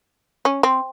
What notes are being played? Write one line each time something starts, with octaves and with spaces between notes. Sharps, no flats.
C#4
C4